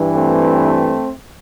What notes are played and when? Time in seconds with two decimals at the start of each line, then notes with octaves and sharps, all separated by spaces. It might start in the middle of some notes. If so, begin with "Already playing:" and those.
Already playing: G2 E3
0.14 A3 C4